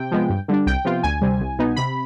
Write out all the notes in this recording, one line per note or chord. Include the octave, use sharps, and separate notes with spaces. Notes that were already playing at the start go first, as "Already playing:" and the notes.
Already playing: C3 G5
F3 G#3 B3
G2
D3 G3 D4
C2 G5
C3 F3 B3 F4
D2 G#5
C3 G3 C4
C2
B2 B3 D#4
C3 B5